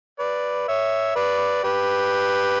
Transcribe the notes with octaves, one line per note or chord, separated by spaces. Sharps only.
B4 D5
C#5 E5
B4 D5
G4 B4